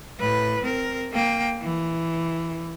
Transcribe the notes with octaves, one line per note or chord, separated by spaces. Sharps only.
A2 B4
C4 A#4
A#3 G5
E3